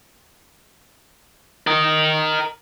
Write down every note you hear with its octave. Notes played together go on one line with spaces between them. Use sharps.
A#4 D#5